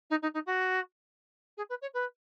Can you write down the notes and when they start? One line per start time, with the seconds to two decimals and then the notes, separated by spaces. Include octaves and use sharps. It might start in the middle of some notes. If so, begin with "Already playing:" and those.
0.10 D#4
0.22 D#4
0.34 D#4
0.46 F#4
1.57 G#4
1.69 B4
1.82 C#5
1.94 B4